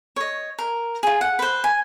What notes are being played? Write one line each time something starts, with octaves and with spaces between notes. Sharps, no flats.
C#5 D#5
A#4
F4 G#4
F#5
B4 C5
G#5